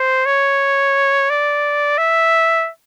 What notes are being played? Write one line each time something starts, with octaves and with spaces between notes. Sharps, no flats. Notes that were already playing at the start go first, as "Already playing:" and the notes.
Already playing: C5
C#5
D5
E5